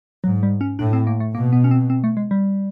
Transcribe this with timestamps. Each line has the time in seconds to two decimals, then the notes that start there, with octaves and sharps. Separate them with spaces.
0.24 G#2 F#3
0.43 G3
0.61 C#4
0.79 A2 D4
0.93 C4
1.07 A#3
1.20 A3
1.34 B2 A#3
1.53 B3
1.64 C#4
1.71 C4
1.90 C4
2.04 A3
2.17 G#3
2.31 G3